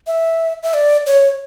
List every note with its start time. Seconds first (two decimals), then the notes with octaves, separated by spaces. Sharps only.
0.07 E5
0.63 E5
0.74 D5
1.06 C#5